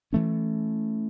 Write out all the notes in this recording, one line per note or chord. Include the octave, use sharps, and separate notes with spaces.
E3 A3 C#4